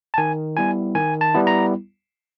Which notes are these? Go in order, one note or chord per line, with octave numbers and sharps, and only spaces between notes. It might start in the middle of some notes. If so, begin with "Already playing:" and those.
A5
D#3 G#5
G3 B3 E4 G#5
D#3 G#5
A5
G3 B3 E4
A#5